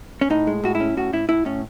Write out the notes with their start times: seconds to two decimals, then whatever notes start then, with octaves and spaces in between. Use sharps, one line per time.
0.21 C#4
0.30 A2 D#4
0.47 G#3
0.64 A2 F#4
0.75 E4
0.80 C#4
0.97 A2 F#4
1.13 A2 E4
1.29 A2 E4
1.45 A2 C#4